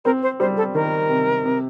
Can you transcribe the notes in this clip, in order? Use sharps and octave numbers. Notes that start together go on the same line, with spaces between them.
C4 A#4
C5
G3 C5
A4
D#3 A#4
C3
C3